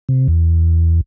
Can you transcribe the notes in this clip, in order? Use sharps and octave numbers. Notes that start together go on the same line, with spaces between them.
C3
E2